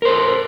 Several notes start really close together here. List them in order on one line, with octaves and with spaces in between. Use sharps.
A#4 C5 A4